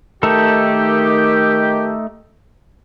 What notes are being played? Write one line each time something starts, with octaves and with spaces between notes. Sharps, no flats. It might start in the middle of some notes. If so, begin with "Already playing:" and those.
D#3 A3 D#4 G4 A4